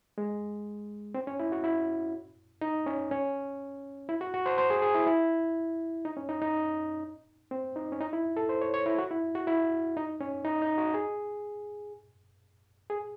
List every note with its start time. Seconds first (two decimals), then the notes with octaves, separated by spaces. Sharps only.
0.18 G#3
1.14 C4
1.27 C#4
1.40 E4
1.52 F#4
1.64 E4
2.61 D#4
2.86 C#4
3.11 C#4
4.09 E4
4.21 F#4
4.34 F#4
4.46 C5
4.58 C5
4.70 G#4
4.82 G#4
4.94 E4
5.07 E4
6.05 D#4
6.17 C#4
6.29 D#4
6.42 D#4
7.51 C4
7.76 D#4
7.92 C#4
8.01 D#4
8.13 E4
8.37 A4
8.49 C5
8.62 C#5
8.74 C#5
8.86 E4
8.99 F#4
9.11 E4
9.35 F#4
9.47 E4
9.97 D#4
10.21 C#4
10.44 D#4
10.62 D#4
10.78 F#4
10.94 G#4
12.90 G#4